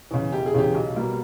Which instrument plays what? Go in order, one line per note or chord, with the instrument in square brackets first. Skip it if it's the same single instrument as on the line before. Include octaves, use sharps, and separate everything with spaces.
[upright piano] E2 C#3
E1 G4
G#4
E2 C#3 G4
B1
B2 G3 A#3